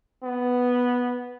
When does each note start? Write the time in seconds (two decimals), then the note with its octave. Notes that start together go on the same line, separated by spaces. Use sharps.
0.24 B3